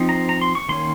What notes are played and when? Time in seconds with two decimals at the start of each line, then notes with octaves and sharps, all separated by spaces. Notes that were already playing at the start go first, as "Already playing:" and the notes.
Already playing: F3 C4 D#4
0.09 A#5
0.29 A#5
0.41 C6
0.55 C#6
0.69 D#3 A#3 C#4 C6